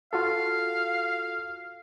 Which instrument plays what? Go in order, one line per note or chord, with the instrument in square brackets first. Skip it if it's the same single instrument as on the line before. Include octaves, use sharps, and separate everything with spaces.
[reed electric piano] F4 F#4 A4 [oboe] F5